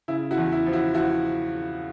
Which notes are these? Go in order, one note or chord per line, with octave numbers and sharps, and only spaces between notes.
C#3 E4
E4 F#4
E2
E4
F3
E4 F#4
F3 E4 F#4